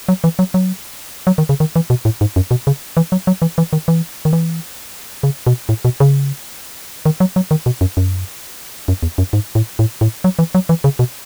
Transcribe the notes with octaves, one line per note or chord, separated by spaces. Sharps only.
F#3
E3
F#3
F#3
F#3
D#3
C#3
D#3
E3
B2
A2
G#2
F#2
B2
C#3
E3
F#3
F#3
E3
E3
D#3
E3
D#3
E3
C#3
B2
A2
B2
C#3
D#3
F#3
F#3
D#3
B2
F#2
F#2
F#2
E2
F#2
G#2
A2
A2
A2
F#3
E3
F#3
E3
C#3
B2